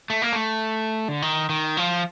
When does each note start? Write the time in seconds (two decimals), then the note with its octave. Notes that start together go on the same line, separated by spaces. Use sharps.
0.10 A3
0.22 A#3
0.32 A3
1.08 D3
1.22 D#3
1.50 D#3
1.77 F3